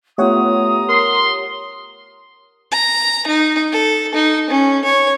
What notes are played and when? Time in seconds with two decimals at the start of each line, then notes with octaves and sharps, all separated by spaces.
0.18 A3 B3 F4 G4 C#5 F#5 A#5 D#6
0.89 A#4 C6
2.71 A#5
3.27 D#4
3.72 A4
4.14 D#4
4.50 C#4
4.84 C#5